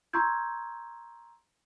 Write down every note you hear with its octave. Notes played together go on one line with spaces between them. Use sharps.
A#5 C6 C#6 E6 G6 G#6